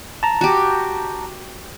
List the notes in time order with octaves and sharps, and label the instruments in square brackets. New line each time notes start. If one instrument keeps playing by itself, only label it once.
[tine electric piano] A5 A#5
[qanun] F#4 G4